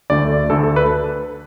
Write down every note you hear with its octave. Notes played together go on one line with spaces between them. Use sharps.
D2 D3 A3 D5
D2 D3 A3 A4
A4
B4